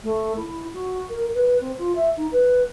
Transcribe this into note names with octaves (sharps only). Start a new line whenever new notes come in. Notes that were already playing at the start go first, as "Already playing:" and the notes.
A3
E4
F#4
A#4
B4
C4
F4
E5
D#4
B4